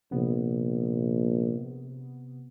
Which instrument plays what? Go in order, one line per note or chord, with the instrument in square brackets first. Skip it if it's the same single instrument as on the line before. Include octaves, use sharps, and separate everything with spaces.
[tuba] A#1 [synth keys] C3 B3